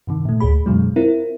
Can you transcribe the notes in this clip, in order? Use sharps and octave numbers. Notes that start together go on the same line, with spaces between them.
G2 C3 D#3
A#2 A3
D2 A2 G#4 B5
F#2 B2 D3 F#3 G#3
C4 E4 F4 A#4